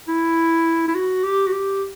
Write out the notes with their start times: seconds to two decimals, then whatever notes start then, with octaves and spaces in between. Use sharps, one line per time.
0.08 E4
0.88 E4
0.95 F#4
1.23 G4
1.47 F#4
1.52 G4